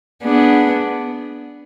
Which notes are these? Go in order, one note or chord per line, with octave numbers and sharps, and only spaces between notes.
B3 D4 G#4